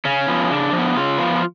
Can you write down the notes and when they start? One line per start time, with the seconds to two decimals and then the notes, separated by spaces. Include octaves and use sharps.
0.05 C#3 C#4
0.28 F3 B3
0.50 C#3 D4
0.73 F3
0.78 B3
0.96 C#3 F4
1.18 F3 B3